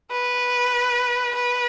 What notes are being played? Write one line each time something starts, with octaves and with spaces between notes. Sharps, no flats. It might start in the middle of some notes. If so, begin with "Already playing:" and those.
B4
B4